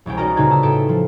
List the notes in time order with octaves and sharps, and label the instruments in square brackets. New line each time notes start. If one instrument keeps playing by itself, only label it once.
[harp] E1 C2 C#4 G5
D#4 F#4 A#4 D5 D#5 A#5
D2 A#2 C#3 D#4 B4 G#6
A5 D#6 E6
A2 A4 G5
F3